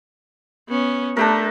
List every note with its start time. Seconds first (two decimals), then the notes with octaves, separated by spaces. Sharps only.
0.68 B3 C#4
1.17 A3 D4 G4 A#4